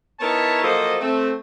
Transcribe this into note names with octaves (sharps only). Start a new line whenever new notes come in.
B3 D#4 E4 A#4 C#5 A5
F3 F#3 A#3 A4 C5 D#5
A3 C4